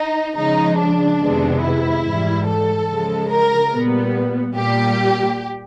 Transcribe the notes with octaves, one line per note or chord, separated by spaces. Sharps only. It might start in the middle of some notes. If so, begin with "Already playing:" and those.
Already playing: D#4
C#3 F3 G#3 D#4
D4
F2 C3 D#3 G#3 B3
E4
G#2 E3 G3
A4
C#3 F3 G#3
A#4
A#2 G3 B3
A#2 G3 A#3 G4